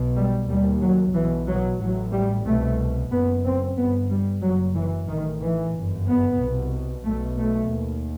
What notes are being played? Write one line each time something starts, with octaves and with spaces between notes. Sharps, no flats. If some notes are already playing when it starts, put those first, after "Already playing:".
Already playing: B1 B2
G3
D#2 G3
F#3
B1 B2 E3
F#3
A1 A2 F#3
G3
C2 B2 A3
F#1 F#2 B3
C4
G1 G2 B3
G3
F#1 F#2 F#3
E3
A1 A2 D#3
E3
G1 F#2
B3
C2 B2
B1 B2 A3
A3
D#2